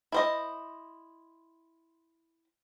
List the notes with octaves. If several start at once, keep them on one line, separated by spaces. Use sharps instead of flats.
E4 C5 D#5